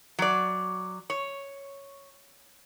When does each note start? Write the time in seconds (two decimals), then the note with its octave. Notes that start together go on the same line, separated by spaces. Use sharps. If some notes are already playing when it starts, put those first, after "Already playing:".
0.19 F#3 D5
1.10 C#5